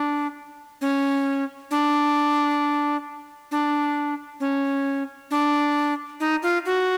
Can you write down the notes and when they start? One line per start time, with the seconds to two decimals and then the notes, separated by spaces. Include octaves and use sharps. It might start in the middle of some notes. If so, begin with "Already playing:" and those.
Already playing: D4
0.81 C#4
1.71 D4
3.51 D4
4.40 C#4
5.31 D4
6.20 D#4
6.43 F4
6.66 F#4